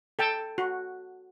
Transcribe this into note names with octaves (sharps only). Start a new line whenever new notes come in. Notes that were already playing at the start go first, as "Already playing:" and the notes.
A4 G5 A5
F#4